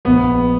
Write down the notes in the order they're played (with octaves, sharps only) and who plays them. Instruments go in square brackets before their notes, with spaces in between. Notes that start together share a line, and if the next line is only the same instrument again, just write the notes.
[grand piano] A#1 B3